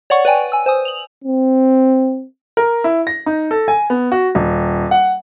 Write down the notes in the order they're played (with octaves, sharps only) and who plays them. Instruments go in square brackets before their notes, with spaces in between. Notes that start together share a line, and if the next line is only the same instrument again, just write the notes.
[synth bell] C#5 D5 F#5 C#6
B4 D5 G5 G#5
G#5 E6
C5 G#5 D#6
F7 F#7
[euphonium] C4
[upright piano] A#4
E4
A#6
D#4
A4
G#5
B3
F#4
D#1
F#5